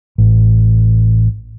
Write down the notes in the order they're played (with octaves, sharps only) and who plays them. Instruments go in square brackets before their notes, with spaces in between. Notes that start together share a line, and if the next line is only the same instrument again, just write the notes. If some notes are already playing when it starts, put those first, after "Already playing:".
[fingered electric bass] A1